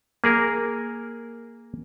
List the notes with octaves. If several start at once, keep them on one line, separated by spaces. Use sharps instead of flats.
A#3 G#4 A#4